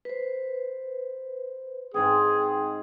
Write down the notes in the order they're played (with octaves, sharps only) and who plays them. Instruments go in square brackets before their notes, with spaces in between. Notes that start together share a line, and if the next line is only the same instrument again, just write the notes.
[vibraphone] B4 C5
[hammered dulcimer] G#2 C4 G5 [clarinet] G#4